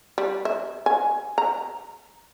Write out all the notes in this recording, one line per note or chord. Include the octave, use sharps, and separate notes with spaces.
G3
E5
G#5
A#5